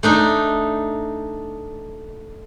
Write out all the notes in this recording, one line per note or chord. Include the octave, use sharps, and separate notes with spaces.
A3 D4 D#4